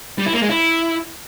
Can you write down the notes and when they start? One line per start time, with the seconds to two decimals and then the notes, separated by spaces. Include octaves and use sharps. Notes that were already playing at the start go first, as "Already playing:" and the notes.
0.18 G3
0.26 E4
0.34 A#3
0.42 G#3
0.49 E4